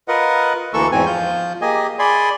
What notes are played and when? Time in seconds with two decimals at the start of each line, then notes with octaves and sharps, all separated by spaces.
0.08 F4 A#4 B4 D#5 F#5
0.74 D2 E3 A#3 A4 C#6 E6
0.92 E2 G#2 C4 G#5
1.06 F3 F4 G6
1.62 A#3 G4 G#4 D#5 G#5
1.99 G#4 D5 G#5 B5 C6